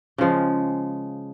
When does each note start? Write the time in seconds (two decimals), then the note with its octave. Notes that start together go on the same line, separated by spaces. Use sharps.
0.18 C#3 F3 G#3